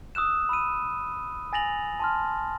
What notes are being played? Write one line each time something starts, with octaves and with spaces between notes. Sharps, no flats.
D#6 E6 F#6 E7
B5 E6 D#7
G#5 A6 A#6 F7 F#7
A5 C6 F6